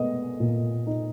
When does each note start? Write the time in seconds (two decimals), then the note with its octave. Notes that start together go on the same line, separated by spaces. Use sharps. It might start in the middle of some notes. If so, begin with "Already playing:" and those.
Already playing: G#3 B3 D#5
0.40 A#2
0.87 D#4